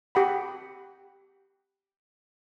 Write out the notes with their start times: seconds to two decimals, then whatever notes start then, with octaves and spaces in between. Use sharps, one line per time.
0.15 G4 F#5 B5